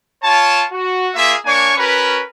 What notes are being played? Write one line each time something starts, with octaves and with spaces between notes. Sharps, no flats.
F4 C#5 A5
F#4
A#3 F4 G#4 E5
A#3 D4 C#5 G#5 C#6
C#4 F#4 A#4 B4